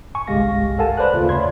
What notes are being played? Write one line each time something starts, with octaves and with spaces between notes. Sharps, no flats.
G#5 C#6
G1 C2 G#3 G4 F5 A#6
A4 A#4 F5 F#5 G#5 A5
B4 C5 D5 A5 F#6
D#2 C#3 A3 F4 F5
C#5 D5 B5 C6 G#6